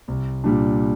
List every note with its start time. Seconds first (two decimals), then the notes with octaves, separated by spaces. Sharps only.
0.08 C2
0.44 A#2 G3 D4